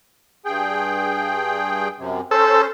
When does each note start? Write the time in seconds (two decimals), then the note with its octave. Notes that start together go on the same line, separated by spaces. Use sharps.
0.45 G2 G#4 G5
1.98 F#2 C3
2.31 C#4 A4 C5